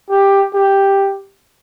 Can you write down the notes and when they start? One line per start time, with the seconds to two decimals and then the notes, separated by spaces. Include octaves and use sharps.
0.10 G4
0.53 G4